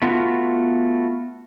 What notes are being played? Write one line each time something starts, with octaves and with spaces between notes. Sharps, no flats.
A3 B3 F4 F#4